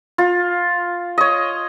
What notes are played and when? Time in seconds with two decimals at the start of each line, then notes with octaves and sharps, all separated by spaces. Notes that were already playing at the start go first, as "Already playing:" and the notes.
0.18 F4
1.18 C#5 D#5